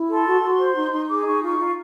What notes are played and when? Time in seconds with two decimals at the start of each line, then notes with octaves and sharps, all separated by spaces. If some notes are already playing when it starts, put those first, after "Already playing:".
Already playing: E4
0.10 A4 C6
0.26 F#4
0.42 F#4
0.60 C5
0.76 D#4
0.92 D#4
1.09 G#4 D6
1.26 D#4 C#6
1.43 F4 C#6
1.59 F4